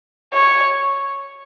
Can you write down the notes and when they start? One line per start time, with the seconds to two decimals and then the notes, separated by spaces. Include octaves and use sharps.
0.33 C#5